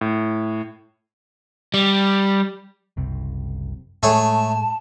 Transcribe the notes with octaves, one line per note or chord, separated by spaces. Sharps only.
A2
G3
F#1 C2 C3
A2 G#3 A3 G#4 C#5 A5